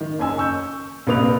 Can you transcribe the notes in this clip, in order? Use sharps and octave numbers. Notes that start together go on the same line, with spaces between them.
D#3
F#1 C#4 G#5 E6
C#6 E6 G6
A#1 C3 A#3 B4 D#6 F7